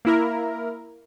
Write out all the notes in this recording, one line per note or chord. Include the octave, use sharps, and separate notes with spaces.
A#3 E4 A#4